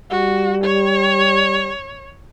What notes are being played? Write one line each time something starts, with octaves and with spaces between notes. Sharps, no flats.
G3 F#4
C#5